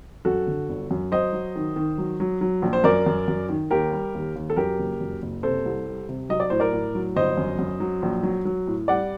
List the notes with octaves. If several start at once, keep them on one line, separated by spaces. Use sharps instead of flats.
F#2 F#4 A4
D3
G1
F#2
F#3 C5 D#5
F#3
D#3
D#3
F#3
F#3
F#3
A#1
C5
F#2 A#4 D5
F#2
F#2
D#3
D#2 G4 A#4
G3
D#2
D#2
A4
F#2 G4 A#4
F#1
F#2
F#1
C3 A4 C5
C2
G3
C3
F#3 D#5
D5
A2 C5
A#4 D5
A2
F#3
G1 C5 D#5
F#2
F#2
F#3
A#1
F#3
F#3
A2
G3 D5 F#5